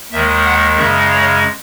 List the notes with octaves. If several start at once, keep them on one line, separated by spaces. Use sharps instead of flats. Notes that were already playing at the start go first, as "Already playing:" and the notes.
D#2 D#3 G#3 E5
F#5
F#2 C#3 G#3 E5
C#5